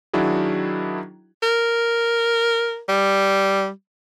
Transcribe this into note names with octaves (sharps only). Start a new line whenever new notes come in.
D#3 F#3 D4 E4 F#4 G#4
A#4
G3